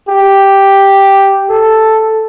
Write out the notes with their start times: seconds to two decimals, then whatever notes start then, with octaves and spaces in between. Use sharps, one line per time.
0.08 G4
1.49 A4